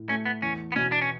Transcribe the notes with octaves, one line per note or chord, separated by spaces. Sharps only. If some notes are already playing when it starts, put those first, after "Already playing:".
Already playing: A2
A3 C#4
B3
E2 C#4
B3
B2 C#4
D4
C#4